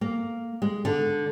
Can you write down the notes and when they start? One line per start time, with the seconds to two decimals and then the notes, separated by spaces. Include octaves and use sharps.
0.01 A#3
0.62 G#3
0.85 D3